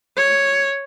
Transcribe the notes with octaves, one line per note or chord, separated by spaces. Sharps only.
C#5